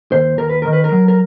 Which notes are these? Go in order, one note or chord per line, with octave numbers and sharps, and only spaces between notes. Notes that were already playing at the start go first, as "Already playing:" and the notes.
D#2 C5
D#2 A#4
B4
D#3 A#4
B4
A#4
F#3
A#4